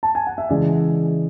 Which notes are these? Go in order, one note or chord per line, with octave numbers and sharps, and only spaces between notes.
A5
G#5
F#5
E5
C#3 E3 G#3 D5